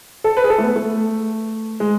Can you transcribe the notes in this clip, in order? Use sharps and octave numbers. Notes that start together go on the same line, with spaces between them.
A4
B4
G#4
A4
A3
B3
A3
G#3